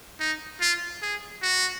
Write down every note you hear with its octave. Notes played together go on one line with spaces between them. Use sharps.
D#4
F4
G#4
F#4